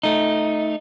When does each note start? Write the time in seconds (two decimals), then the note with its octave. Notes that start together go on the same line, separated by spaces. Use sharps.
0.03 A3 D#4